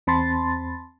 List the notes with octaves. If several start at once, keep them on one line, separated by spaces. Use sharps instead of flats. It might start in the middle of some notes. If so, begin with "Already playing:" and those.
E2 C4 A5 B5 C6 A6